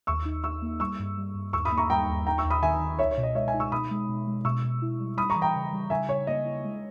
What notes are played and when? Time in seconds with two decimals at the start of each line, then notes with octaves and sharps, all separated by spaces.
0.07 D#2 C#6 E6
0.25 D#4
0.44 D#4 C#6 E6
0.62 A#3
0.80 G3 C#6 E6
0.99 G2
1.18 G3
1.35 G2
1.53 D#2 C#6 E6
1.65 B5 D#6
1.72 A#3
1.77 A#5 C#6
1.89 G3 G5 A#5
2.09 D#2
2.26 D#4 G5 A#5
2.38 C#6 E6
2.45 D#2
2.50 B5 D#6
2.62 D#3 E5 G#5
2.80 D#3
2.99 C#2 C#5 E5
3.11 C#5
3.18 B2
3.23 D#5
3.35 G#3 C#5 E5
3.48 E5 G#5
3.54 D#4
3.60 C#6 E6
3.71 B2 B5 D#6
3.91 G#3
4.08 B2
4.27 G#3
4.44 B2 C#6 E6
4.64 B2
4.82 E4
5.00 G3
5.17 G3 B5 D#6
5.30 A#5 C#6
5.36 E3
5.42 G5 A#5
5.55 C#3
5.73 G3
5.90 C#3 E5 G#5
6.08 C#3 C#5
6.27 A#3 D#5
6.45 E4
6.64 G#3